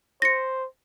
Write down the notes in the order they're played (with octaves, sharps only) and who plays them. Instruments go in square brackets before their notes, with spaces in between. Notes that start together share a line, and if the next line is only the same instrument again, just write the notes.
[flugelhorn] C5 [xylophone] A#6 C#7